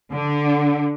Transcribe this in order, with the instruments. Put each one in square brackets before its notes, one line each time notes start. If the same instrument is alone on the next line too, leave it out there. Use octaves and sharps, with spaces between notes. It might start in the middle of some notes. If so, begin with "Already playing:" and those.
[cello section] D3